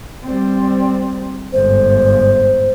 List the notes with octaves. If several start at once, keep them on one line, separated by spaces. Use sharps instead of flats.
G3 C4
G1 G#2 C5